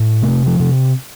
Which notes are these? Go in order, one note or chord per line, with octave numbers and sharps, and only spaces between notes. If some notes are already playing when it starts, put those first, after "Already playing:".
Already playing: A2
C3 A3
F3
C3